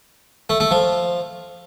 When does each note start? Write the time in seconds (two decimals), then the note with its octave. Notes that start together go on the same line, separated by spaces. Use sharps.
0.50 A3
0.60 A3
0.71 F3